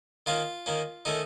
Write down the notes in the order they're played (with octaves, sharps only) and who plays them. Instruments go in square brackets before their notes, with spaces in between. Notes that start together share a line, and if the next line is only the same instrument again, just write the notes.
[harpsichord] D#3 A#3 C#4 F4
D#3 A#3 C#4
D#3 A3 C#4 D#4